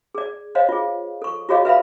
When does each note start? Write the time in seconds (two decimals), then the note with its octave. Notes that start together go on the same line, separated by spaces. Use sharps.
0.15 G#4 D5
0.55 C5 C#5 D#5 F5
0.69 F4 G#4
1.22 A4 C#6
1.49 F4 F#4 G#4 C#5 D#5 F5
1.65 B4 E5 F5 B5